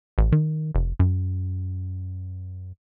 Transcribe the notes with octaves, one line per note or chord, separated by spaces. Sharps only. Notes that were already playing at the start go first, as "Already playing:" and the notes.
A1
D#3
F1
F#2